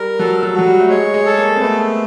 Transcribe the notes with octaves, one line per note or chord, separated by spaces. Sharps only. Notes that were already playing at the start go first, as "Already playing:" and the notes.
Already playing: G3 A#4
F#3 A4
F#3
F#3 F#4
G3
A3
G#3 C#5
G#3
A4
A#3
C4
A3 B3